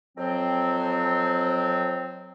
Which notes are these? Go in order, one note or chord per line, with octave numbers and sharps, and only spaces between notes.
F2 F#3 C4